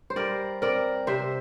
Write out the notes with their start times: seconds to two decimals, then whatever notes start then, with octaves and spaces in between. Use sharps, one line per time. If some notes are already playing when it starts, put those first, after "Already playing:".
0.10 C5
0.16 G3 A#4 D5
0.62 C4 A#4 D5
1.07 C3 C5 E5